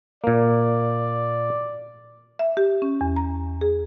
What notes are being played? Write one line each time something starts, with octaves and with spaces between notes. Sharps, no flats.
A#2 A#3 D5
E5
G4
C#4
E2
A#5
G#4